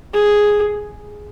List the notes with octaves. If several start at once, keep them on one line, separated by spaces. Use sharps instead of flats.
G#4